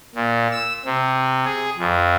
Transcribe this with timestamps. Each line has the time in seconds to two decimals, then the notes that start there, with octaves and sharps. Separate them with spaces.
0.15 A#2
0.52 E6
0.86 C3
1.45 G#4
1.78 F2